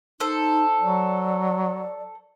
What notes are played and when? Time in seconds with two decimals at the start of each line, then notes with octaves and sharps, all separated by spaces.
0.20 D#4 A4 C5
0.81 F#3 D5